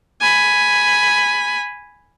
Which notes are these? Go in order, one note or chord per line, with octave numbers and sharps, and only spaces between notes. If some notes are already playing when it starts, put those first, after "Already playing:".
G#5 B5